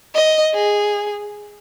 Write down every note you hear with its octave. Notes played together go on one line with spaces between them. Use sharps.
D#5
G#4